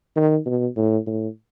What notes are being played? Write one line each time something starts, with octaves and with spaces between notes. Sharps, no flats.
D#3
B2
A2
A2